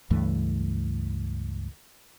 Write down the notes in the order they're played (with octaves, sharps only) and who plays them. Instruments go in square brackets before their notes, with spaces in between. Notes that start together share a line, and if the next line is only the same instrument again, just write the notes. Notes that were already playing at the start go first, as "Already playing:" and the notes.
[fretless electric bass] C#2 G2 E3 A3